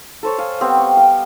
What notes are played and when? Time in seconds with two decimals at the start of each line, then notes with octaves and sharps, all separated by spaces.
0.23 A4 C5 C#5
0.38 F5 G#5
0.61 G3 B3 C4
0.78 C#6
0.97 F5 G5